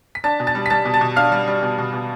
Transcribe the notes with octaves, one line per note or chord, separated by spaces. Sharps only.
B6
D4 A5 A6
B2
A5 A6
G3
B6
G3 A5 A6
B2
A5 A6
B2
D4 F5 F6
G3
G3
B2
B2
B2